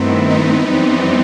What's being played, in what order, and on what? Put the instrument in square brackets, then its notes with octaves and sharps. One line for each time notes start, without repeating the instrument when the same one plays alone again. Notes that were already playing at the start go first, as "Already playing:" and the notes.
Already playing: [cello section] G2 D#3 A3 C4 E4 [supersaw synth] B3
[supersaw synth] D#4
[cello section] F#2 E3 G3 C4